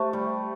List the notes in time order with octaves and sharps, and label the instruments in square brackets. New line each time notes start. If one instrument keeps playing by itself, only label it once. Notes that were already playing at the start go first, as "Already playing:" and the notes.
Already playing: [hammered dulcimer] A3 [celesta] G4 C5 E5
[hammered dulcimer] G3